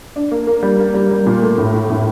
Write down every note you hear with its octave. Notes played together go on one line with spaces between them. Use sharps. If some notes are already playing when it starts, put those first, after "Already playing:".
D4
A#3
A#3
G3
A#3
G3
G3
A#2
A3
A2
A3
A2